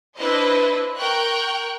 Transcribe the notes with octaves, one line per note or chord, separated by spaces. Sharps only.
D4 E4 B4 C5 D#5
A#4 G5 C#6 F#6